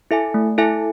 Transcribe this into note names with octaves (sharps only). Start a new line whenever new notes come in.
E4 A4 E5 G#5
A3
E4 A4 E5 G#5